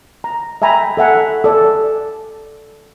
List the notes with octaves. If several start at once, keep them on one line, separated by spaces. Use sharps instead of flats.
A#5
E5 G5 G#5 A#5 B5
A4 E5 F#5 G#5
A4 D5 G#5